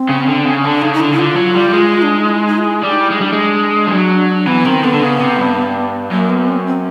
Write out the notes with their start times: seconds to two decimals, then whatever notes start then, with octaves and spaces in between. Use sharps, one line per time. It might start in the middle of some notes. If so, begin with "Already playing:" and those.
Already playing: C4
0.09 C#3
0.28 D3
0.46 C#3
0.54 C#4
0.64 D3 D4
0.82 C#3 D#4
0.93 D#4
1.00 D3 E4
1.12 C#3 E4
1.19 D3 F4
1.37 F#3
1.55 G3
1.73 G#3
2.02 D4
2.16 D#4
2.28 E4
2.47 D#4
2.58 F4
2.64 E4
2.83 G3
2.90 D#4
3.01 E4
3.10 G#3
3.19 G3 D4
3.33 G#3
3.87 F3
3.92 F#3
4.47 E3 B3
4.65 D#3 C4
4.83 D3 B3
4.94 D3
5.02 C#3
5.20 C3
5.39 G2
6.11 F#2 A#3
6.30 B3
6.47 C4
6.66 C4